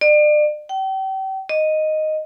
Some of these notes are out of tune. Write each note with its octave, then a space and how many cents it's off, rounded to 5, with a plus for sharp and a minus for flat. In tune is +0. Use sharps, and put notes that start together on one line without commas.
D5 +35
G5 -35
D#5 -5